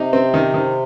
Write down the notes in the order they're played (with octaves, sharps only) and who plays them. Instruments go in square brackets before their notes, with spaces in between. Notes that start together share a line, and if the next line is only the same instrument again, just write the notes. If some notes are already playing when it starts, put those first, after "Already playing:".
Already playing: [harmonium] C3 [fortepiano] D#4
[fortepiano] C4
D#3
D#3